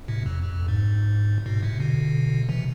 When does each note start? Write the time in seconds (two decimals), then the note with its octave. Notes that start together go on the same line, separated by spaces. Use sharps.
0.08 A2 C3
0.26 F2
0.43 F2
0.68 G#2
1.46 G#2 B2
1.63 A2 C3
1.80 B2 D3
2.49 C3 E3